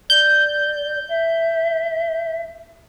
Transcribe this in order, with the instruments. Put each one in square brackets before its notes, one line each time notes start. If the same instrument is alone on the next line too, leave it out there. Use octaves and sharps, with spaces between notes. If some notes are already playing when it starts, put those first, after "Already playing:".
[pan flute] D5 [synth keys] G6
[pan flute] E5